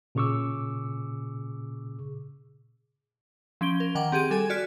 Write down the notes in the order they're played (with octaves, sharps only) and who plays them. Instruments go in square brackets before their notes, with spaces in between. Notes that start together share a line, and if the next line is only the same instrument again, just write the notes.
[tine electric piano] A#2 C#3 G#4 C#6 D6 E6
[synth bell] F3 C#4 D7 G7
A#4
D#3 F#5 G5 D6 F#7
C4 G4 G#4 D#7
G3 A4 G#5 G#6
F#4 D5 F6 B6